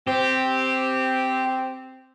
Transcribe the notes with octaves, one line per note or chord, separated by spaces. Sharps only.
C4 G4